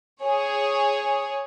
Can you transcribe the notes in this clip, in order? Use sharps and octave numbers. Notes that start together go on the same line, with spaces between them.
G#4 C#5